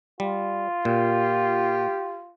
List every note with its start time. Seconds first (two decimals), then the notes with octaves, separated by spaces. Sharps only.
0.20 G3 F4
0.85 A#2 G4